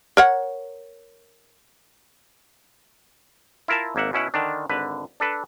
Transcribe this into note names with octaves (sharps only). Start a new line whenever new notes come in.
A#4 C#5 F#5
E4 F4 A#4 E5 A5
G#1 A#3 E5 F#5
B2 C#4 E4 F#5
D3 D#3 D4
G#1 D3 B4
D4 A4 B4